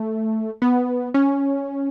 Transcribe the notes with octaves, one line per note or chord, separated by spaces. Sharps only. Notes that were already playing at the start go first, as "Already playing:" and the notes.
Already playing: A3
B3
C#4